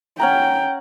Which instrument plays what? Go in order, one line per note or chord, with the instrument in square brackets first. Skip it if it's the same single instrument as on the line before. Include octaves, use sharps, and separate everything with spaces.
[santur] C#4 F#5 A#5 [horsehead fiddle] G5